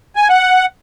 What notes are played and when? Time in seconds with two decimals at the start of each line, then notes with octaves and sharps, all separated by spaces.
0.16 G#5
0.29 F#5